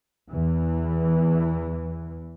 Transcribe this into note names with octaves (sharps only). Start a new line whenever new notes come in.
E2 E3